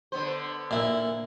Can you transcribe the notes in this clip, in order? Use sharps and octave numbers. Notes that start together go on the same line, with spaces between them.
D3 B3 C5
A#2 E4